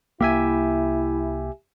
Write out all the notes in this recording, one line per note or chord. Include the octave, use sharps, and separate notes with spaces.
C2 A#3 E4 G4 E5 G#5